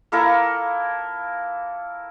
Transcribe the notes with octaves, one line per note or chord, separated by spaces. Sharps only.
A#3 E4 A4 A#4